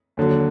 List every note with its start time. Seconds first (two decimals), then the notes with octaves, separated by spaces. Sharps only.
0.17 D#2 D3 F#3